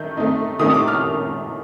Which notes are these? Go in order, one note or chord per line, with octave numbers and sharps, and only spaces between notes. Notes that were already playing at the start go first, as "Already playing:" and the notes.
Already playing: D#3 A3 D#4 G6
D#3 A3 C4 D#4
D#3 A3 C4 D#4 D#6
D6
F6